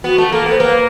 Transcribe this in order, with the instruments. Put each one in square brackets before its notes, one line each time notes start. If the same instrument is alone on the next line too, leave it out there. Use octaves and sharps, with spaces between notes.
[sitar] B3 [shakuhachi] F#4
[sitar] A3
[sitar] A#3 [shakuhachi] A4
[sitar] B3
[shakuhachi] C5
[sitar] A#3 [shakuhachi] B4